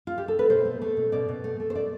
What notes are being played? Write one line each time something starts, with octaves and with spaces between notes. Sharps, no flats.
F4
G4
A4
B4
B2 C5
A3
A3
B2
B2 D5
B2
A3
A3
C5
D5